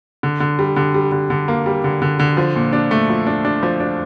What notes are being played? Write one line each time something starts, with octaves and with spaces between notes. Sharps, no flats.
D3
D3
G3
D3
G3
D3
D3
A#3
G3
D3
D3
D3
F3
A#2
D4
A3
F3
D4
D4
F3
D4